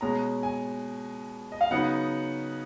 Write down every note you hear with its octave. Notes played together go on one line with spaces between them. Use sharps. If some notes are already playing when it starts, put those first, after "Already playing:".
B2 G#3 C#4 A#5
G#5
D#5
F5
C#3 F#3 B3 D#4 F#5